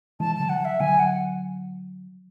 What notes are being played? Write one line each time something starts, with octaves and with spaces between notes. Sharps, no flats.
E3 G#3 A5
D3 F#3 A5
F#5
E5
D3 F#3 G#5
F#5